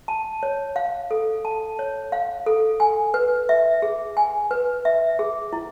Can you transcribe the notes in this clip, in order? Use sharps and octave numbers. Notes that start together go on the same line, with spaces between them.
A5
C#5
F5
A4
A5
C#5
F5
A4
G#5
B4
E5
G#4
G#5
B4
E5
G#4
E4